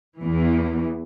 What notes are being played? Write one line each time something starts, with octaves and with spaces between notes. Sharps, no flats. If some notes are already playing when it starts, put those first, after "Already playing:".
E2 E3